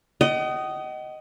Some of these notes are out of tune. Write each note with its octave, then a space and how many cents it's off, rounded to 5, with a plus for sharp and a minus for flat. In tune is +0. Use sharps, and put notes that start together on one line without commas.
D#5 +0 F#5 +45